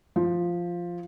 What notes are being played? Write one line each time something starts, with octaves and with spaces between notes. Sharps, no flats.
F3